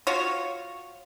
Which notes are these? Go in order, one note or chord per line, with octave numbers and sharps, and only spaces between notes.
F4 F#4 C#5